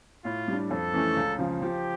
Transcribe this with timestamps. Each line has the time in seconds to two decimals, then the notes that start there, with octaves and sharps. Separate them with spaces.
0.24 A2 F4
0.48 G3 D4
0.70 F2 A4
0.94 E3 A3 C#4
1.16 C#2
1.39 C#3 F3
1.62 F3 G4